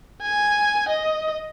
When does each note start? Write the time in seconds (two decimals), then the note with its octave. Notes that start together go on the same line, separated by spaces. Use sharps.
0.23 G#5
0.89 D#5